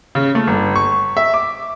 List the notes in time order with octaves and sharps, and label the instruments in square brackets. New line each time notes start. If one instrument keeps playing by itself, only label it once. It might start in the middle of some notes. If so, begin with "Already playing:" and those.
[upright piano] C#3
A3
G1
C#6
E5
D6